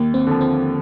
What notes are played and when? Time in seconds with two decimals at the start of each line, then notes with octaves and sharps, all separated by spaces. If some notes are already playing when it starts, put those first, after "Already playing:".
Already playing: D#2 A#3
0.14 C4
0.27 D3 F3
0.41 C4